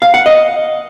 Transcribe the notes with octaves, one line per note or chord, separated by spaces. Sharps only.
F5
F#5
D#5